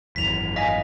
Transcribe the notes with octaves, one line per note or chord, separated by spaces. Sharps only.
G#1 F#2 E3 B6 F7
D#5 F5 G#5 A#6 B6